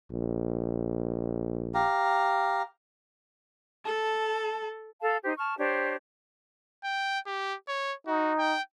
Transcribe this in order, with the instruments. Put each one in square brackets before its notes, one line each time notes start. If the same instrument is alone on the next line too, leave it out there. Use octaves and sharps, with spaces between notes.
[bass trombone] A#1
[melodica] G4 F5 A#5
[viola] A4 [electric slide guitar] A5
[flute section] A4 F5 A5
D#4 G4 C5
A5 C#6 F6
D4 G4 C5 C#5
[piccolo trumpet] G5
G4
C#5
[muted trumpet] D#4 [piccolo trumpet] F#4
[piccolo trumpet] G5